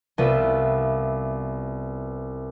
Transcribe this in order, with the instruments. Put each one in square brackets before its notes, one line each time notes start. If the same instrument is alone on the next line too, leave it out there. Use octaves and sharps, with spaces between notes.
[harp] C2 B3 F4 E5